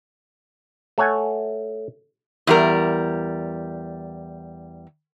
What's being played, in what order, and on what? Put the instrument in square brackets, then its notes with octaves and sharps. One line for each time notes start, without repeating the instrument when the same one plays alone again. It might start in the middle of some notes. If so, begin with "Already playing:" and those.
[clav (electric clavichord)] A3 A4 C#5 F#5 G#5
[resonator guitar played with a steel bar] E2 G3 A#4